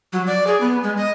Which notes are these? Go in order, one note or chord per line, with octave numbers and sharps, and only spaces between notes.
F#3
D5
G#4
B3
G#3
D#5